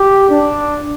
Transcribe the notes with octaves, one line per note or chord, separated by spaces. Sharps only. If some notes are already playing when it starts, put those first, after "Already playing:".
Already playing: G4
D4